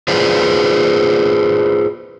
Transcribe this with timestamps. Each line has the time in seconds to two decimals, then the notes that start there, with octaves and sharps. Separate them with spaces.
0.08 F4 G#4 B4 C5 D5